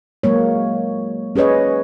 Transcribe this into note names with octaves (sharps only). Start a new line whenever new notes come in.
F#3 G#3 A#3 C#5
C#4 G#4 B4 C#5 D#5